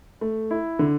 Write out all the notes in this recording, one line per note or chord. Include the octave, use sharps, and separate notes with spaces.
A3
E4
D3